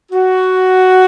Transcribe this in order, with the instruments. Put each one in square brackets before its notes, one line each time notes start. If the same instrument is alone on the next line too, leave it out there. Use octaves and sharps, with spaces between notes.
[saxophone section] F#4